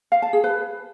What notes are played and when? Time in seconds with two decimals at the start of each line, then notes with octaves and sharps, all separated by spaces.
0.12 F5
0.22 A5
0.33 G#4
0.44 B4